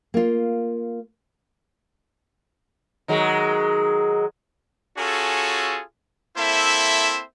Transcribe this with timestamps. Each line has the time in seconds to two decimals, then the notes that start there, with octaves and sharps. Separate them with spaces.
0.14 A#3 F4
3.08 D#3 F#3 G#3
4.98 C#4 F4 F#4 G#4 A4
6.37 A#3 C4 E4 A4 C5 E5